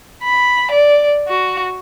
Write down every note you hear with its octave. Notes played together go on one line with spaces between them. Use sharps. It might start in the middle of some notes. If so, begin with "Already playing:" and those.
B5
D5
F#4